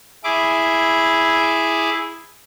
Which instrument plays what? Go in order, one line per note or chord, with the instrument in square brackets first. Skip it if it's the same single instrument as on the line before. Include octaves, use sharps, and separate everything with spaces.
[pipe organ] E4 G#4 D6